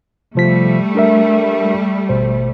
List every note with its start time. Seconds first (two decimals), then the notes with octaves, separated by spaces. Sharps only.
0.35 C3 F3 G3 A3 B6
0.95 D4 A#4 E5
2.09 G#1 B2 C5